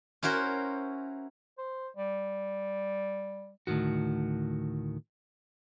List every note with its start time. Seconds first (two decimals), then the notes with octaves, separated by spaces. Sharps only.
0.23 C#4 E4 F#4 A#4 C5
1.58 C5
1.97 G3
3.67 D2 A2 C3 D#3 F#4